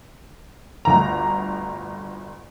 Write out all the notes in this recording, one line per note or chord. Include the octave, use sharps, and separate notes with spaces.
G1 D2 A#5